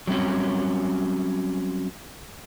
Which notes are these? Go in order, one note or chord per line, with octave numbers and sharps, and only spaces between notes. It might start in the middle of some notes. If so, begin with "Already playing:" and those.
F#3 G3 C4 C#4